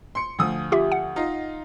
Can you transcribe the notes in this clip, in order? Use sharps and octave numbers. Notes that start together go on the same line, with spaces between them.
C6 C#7
D2 F3 D#6
F4 G4 E5
F#5
D#4 F4 D#5